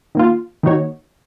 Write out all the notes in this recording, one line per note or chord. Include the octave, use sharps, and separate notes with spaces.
D#3 A#3 F4
D#3 A#3 D#4 F#4 C#5